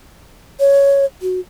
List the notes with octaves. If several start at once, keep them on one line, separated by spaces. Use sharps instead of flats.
C#5
F#4